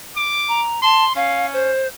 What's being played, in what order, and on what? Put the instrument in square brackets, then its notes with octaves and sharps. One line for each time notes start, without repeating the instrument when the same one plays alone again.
[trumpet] D6
[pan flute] A#5
[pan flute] A5 [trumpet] C6
[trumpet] C#4 [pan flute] F5
[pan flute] C5